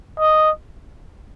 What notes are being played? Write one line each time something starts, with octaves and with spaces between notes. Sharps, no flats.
D#5